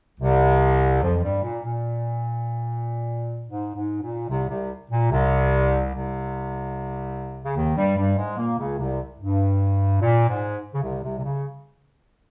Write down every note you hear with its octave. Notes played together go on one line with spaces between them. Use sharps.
C2 C3
F2 F3
F3
G2 G3
A#2
A#2
G#2
G#2
A#2
C2 C3
C2 C3
A#2
C2 C3
C2 C3
C#3
D#2 D#3
G2 G3
G2 G3
G#2 G#3
A#2 A#3
C#2 C#3
C2 C3
G2
A#2
G#2
C#3
C2 C3
C2 C3
C3
C#3